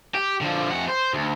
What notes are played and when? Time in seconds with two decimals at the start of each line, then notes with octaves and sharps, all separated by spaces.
0.15 G4
0.41 D3 F3
0.70 F2 F#5
0.88 C5
1.13 D2